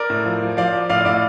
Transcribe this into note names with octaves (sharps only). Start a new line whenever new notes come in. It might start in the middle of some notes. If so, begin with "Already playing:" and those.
Already playing: A#4 D5
A2
F3
F3
F3 D5 F5
F3
A2 D5 F5
A2 D5 F5